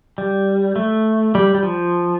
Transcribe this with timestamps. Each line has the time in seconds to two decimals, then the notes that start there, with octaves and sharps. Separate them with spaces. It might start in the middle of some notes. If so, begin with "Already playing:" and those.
0.18 G3
0.76 A3
1.35 G3
1.54 G3
1.63 F3